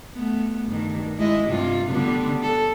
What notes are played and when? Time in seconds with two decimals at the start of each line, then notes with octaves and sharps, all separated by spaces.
0.14 A3 B3
0.66 G2 D#3
1.18 G#3 E4 D#5
1.47 G2 C3 F4
1.92 D3 G3 B3
2.43 A4